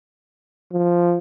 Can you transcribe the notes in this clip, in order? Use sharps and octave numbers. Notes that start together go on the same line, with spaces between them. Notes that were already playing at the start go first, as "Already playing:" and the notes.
F3